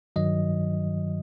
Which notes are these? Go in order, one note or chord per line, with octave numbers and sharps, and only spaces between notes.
G2 D#3 F#3 D#5